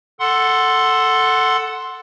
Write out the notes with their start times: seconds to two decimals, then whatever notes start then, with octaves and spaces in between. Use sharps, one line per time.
0.20 A4 F#5 C6